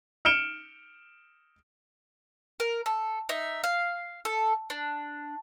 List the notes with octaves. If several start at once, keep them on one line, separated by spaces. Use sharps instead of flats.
F6 C#7 D7 E7 G7
A#4
A4
D#4 E5
F5
A4
D4